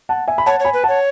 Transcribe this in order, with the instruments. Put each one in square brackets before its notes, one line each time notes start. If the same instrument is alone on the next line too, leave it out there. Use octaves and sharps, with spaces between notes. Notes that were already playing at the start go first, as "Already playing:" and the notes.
[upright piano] F#5 A5
E5 G#5
B5
[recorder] C#5 [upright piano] F#5 A5
[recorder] C#5
[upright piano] G#5 B5
[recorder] B4
[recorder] C#5 [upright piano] F#5 A5